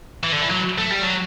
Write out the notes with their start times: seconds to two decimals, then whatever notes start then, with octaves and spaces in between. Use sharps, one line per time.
0.24 E3
0.32 D3
0.42 E3
0.51 F#3
0.78 A3
0.90 G3
1.02 F#3